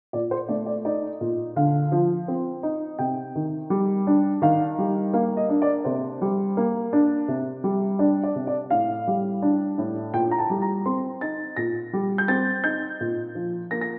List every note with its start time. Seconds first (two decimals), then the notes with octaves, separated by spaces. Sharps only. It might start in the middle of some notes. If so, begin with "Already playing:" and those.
0.13 A#2 D5
0.31 C5
0.49 A3 D5
0.66 D5
0.85 D#4 D5
1.21 A#2
1.56 D3 F5
1.92 F3
2.28 C4
2.63 D#4
2.99 C3 G5
3.35 D#3
3.70 G3
4.07 D4
4.42 D#3 F5
4.79 G3
5.13 A#3 F5
5.37 D#5
5.49 D4
5.62 D5
5.85 C3 C5
6.21 G3
6.57 A#3
6.93 D4
7.28 C3
7.64 G3
7.99 D4 D5
8.23 D5
8.35 C3
8.47 D5
8.70 A2 F5
9.07 G3
9.42 D4
9.78 A2
10.14 A#2 G5
10.31 A#5
10.38 A5
10.50 G3
10.62 A#5
10.86 C4 C6
11.21 D#4 A6
11.56 A#2 A#6
11.93 G3
12.18 G6
12.28 C4 A6
12.64 D#4 G6
13.00 A#2
13.35 F3
13.71 A#3 A#6
13.81 A#6